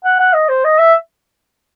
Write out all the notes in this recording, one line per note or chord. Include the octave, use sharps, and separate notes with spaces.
F#5
F#5
D#5
C5
D#5
E5